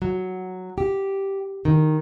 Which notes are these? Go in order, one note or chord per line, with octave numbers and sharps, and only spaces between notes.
F#3
G4
D#3